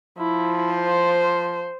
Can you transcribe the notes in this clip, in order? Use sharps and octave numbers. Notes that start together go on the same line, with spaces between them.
F3 E4
C5